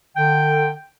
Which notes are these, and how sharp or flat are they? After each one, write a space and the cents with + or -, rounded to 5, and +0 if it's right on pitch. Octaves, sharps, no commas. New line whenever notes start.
D3 +30 G5 +0